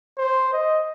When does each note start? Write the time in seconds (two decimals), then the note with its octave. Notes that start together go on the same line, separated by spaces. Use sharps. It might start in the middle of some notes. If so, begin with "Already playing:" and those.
0.18 C5
0.53 D#5